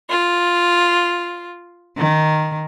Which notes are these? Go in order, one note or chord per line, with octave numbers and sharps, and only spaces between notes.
F4
D#3